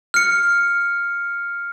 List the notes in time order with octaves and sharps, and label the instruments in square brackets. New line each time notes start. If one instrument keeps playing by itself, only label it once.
[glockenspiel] F6 C#7